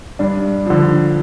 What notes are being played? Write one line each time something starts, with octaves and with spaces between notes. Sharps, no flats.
G2 D4
D3 F3